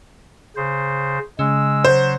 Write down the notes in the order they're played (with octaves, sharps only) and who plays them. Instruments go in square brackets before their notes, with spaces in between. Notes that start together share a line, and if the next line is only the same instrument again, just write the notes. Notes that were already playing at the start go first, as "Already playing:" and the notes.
[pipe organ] C#3 C5
[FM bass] C#3 [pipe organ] G#3 E6
[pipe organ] F#3 [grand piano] C5